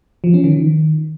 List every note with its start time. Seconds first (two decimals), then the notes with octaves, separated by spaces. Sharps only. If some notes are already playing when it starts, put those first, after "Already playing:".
0.24 F3
0.34 C#4
0.44 D#3
0.54 D#3